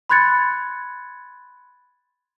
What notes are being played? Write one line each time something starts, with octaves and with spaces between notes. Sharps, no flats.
B5 C6 F#6 G#6 A6 C#7